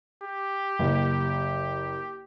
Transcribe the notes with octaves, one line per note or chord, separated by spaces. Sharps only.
G4
F#1